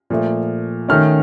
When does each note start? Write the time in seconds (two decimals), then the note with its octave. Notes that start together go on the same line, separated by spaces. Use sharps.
0.10 A#2 F3 A3
0.89 D#3 A3 C#4 F6